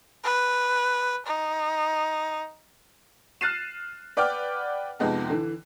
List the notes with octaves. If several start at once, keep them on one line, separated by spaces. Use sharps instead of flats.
B4
D#4
F6 F#6 A6 C7 D#7 E7
B4 D5 F#5 G5 D6 F6
F2 C3 G#3 B3 D#4
D3 E3